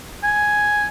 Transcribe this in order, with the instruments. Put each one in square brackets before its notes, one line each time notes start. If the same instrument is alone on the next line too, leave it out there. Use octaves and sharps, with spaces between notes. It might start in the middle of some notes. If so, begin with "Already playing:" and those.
[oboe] G#5